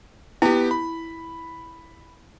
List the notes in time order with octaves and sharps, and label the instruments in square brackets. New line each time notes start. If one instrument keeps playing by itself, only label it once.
[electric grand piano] B3 G4 [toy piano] E4
[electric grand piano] B5